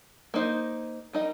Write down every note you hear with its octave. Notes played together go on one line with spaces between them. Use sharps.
A#3 D#4 C5 D#5
G3 D#4 A#4 D#5